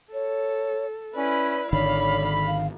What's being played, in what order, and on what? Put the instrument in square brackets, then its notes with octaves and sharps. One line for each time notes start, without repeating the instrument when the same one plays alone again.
[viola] A4 [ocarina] C#5
[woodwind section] C#4 [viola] E4 B4 [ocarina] D5
[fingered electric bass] G#1 D3 D#3 [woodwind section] A4 D5 B5 [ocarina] C#5 [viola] F5
[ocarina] F5